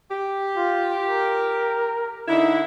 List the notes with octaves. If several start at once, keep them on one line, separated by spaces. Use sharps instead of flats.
G4
F4
A#4
D3 D#4 E4